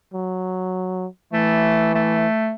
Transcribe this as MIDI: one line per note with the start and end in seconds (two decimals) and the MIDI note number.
0.14 1.06 54
1.33 2.26 52
1.33 1.91 57
1.95 2.54 57